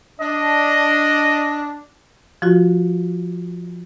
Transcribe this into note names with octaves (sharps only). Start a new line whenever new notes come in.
D4 D#5
F3 F4 F#4